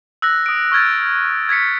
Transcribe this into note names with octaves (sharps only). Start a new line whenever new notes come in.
E6 F#6 A#6
D#6 D7
C#6 F6 G#6 A6
G#6 A6 B6 C#7